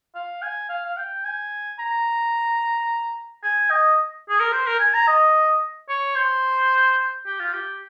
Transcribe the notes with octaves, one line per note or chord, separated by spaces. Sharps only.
F5
G#5
F5
F5
G5
G#5
A#5
G#5
D#5
G#4
A#4
C5
A#4
G#5
A#5
D#5
C#5
C5
G4
F4
G4